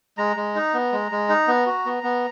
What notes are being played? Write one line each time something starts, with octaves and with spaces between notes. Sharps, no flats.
G#3 A#5
G#3
D#4
B3
G#3
G#3
D#4
B3
F#4
B3
B3